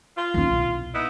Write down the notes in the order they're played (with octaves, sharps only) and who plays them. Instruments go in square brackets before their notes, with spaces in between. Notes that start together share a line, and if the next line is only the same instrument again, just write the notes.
[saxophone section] F4
[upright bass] D#2 C#4
C2 B2
[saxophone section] B3 D#4 E4